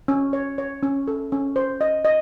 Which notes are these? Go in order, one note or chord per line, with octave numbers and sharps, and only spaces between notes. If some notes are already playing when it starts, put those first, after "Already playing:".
C#4
C#5
C#5
C#4
A4
C#4
C5
D#5
D#5